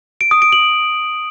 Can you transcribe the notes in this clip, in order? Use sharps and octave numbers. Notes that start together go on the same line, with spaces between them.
D7
D#6
D7
F#7